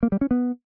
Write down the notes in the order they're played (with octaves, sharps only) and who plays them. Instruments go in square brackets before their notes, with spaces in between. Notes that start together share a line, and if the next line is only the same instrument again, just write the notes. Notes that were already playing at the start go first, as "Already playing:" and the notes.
[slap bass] A#3
G3
C#4
B3